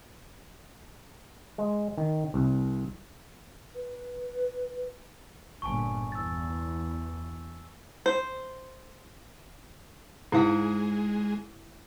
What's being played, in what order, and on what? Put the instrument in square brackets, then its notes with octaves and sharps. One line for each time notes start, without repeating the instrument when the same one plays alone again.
[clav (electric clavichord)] G#3
D#3
C2
[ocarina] B4
[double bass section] G1 A#2 [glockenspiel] G#5 A5 C#6
[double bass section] E2 [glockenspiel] E6 A6
[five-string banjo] C5
[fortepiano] G#2 [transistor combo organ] G#3 [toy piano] E4 F5 F#5